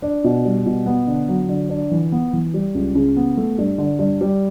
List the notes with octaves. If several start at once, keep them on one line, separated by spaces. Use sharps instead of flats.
D4
B2
G3
B2
B3
D3
F#3
D3
D4
E3
B3
E3
G3
C#2
C#3
B3
A3
G2
D3
G2
G3